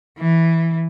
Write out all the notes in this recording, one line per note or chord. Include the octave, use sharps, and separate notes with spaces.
E3